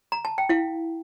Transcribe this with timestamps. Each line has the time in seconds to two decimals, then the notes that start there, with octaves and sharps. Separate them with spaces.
0.12 A#5
0.25 A5
0.38 G5
0.49 E4 F5